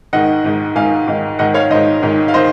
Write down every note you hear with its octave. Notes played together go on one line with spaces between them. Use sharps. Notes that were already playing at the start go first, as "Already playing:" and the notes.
G#2 D#3 D#5 F#5
G#2 D#3
G#2 D#3 F5 G#5
G#2 D#3
G#2 D#3 D#5 F#5
C#5 F5
G#2 D#3 C5 D#5
G#2 D#3
F5
D#3 C5 D#5